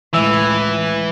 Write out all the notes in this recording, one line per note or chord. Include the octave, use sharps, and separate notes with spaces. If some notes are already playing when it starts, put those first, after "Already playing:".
C#2 A2 E3 E5 E6 F7